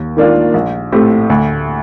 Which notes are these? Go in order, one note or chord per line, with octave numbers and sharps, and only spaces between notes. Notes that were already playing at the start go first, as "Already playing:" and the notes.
Already playing: D#2
D#3 A#3 D4 F4
A#1
A2 A3 C4 G4
D2